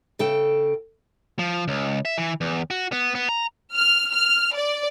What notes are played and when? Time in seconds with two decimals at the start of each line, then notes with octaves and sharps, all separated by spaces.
0.19 C#3 A4 G5
1.39 F3
1.68 C#2
2.05 E5
2.18 E3
2.41 E2
2.71 F#4
2.92 B3
3.15 B3
3.29 A#5
3.74 F6
4.13 F6
4.55 D5